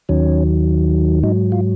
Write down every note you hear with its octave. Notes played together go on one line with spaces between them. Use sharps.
D#2 D#3 F#3 C#4
G#2 F#3 D#4
F4